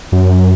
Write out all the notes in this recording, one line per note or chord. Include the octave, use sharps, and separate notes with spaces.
F#2